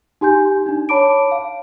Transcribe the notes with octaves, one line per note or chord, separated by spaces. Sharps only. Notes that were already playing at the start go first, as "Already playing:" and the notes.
D#4 G4 G#5 G6
D4 D#4
C#5 A5 B5 D6 D7
F5